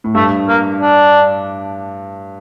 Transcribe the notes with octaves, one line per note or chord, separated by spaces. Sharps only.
A2
G2 A3
A#3
D4